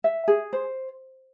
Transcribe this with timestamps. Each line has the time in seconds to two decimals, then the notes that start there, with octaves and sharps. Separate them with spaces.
0.04 E5
0.28 G#4
0.53 C5